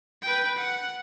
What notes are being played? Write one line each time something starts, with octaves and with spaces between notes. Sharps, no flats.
B4 G5
F#5